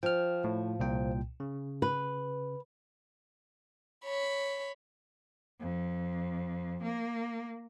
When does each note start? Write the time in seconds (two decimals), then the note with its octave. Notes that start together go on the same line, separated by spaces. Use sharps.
0.03 F3 G5 F6
0.44 A2
0.80 C2 A#2 G5
1.40 C#3
1.82 B4
4.05 C#5 B5
5.60 F2
6.83 A#3